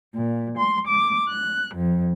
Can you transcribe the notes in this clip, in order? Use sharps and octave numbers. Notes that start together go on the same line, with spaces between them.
A#2
C6
D6
F#6
F2